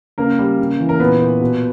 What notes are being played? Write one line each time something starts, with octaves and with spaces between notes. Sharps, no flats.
C#3 A#3 A#4
G3
C#3
E3
A#4
A#2 B3 B4
A#2
B2